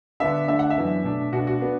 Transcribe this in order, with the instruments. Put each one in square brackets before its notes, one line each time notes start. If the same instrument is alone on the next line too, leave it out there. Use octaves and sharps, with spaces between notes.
[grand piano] D3 B3 D4 E5
D3 A3 D4 E5
F#5
E5
F#2 E3 B3 D4
B2 A3 D4
B2 A3 D4 F#4
F#4
B3 D4